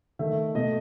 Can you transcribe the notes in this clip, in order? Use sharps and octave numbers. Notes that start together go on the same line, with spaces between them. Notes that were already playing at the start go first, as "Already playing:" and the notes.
D#3 A3 E5
B2 A3 D#5